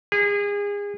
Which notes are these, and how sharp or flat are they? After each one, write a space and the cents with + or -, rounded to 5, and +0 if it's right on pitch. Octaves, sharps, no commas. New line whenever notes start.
G#4 -30